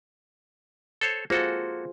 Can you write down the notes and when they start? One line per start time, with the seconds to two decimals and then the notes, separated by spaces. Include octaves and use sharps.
1.01 A4 C5 C#5
1.30 A#3 F4 F#4 G#4 A4 C5